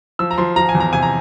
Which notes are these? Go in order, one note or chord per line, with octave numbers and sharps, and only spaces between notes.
F3 E6
A#5
F3 C6
F3 A#5
G#5
E2
A#5
C3 G#5
A#5